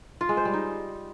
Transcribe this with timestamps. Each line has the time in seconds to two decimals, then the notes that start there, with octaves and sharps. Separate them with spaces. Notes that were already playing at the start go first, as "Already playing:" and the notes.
0.21 F4
0.29 G#3
0.37 C5
0.45 G3
0.54 D#4